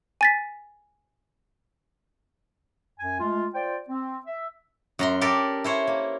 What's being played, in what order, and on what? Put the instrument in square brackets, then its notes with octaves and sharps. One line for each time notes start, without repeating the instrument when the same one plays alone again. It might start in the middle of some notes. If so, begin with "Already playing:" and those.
[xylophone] G#5 A6 B6
[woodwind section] F#2 G#5
G#3 A3 F4
F4 C5 D5 G5
C4
E5
[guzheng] F#2 A#5 C6
G4 A4 A#4 D5
E4 C5 C#5
A#3